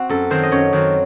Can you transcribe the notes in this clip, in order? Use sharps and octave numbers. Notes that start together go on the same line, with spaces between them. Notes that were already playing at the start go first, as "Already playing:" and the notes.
Already playing: C4 F#4
F#2 A4
D#3 F#3 C4 C5
D#5
F#2 C#5
D#3 F#3 C4